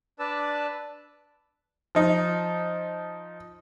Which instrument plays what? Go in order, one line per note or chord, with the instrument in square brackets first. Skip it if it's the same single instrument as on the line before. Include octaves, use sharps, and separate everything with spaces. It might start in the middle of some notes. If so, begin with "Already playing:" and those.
[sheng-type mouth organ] D4 B4 D5 A5 E6
[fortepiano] F3 D#4